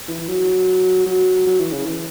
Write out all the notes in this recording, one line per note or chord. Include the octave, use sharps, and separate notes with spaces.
E3
F#3
F#3
F#3
E3
C#3
E3